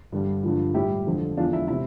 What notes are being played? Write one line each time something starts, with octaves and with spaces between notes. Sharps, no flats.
G2 D3 G3
G2 D3 F3
A2 G3 E4 G4
F2 D3 F3
E2 D3 F3 D4 F4
E4
C3 E4